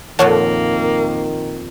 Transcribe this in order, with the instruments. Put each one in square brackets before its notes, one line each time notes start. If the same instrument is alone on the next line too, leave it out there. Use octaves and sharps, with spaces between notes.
[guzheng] F2 A#2 F3 [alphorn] D#3 [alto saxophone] A#3 [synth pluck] C#5 F#5 A5